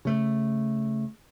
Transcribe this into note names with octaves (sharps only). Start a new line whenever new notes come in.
C#3 A3